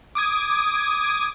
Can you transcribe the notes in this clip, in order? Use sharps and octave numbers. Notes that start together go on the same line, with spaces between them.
D6 D#6 G#6